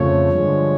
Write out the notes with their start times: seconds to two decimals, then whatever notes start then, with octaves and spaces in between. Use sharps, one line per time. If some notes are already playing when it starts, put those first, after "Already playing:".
Already playing: F2 C#3 F3 A3 C#5
0.30 G2 D3 F3 G#3